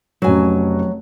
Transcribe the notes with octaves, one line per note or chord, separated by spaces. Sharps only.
F1 F#3 C#4 F#4 G#5